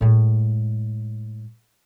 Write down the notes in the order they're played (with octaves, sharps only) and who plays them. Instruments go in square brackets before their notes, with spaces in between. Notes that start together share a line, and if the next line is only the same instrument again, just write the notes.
[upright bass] A2 G#3